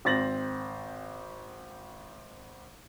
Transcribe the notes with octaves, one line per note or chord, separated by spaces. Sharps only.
G#1 C4 A6 A#6 F#7